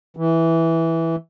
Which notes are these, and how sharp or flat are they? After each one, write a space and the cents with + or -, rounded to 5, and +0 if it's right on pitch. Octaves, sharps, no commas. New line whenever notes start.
E3 -5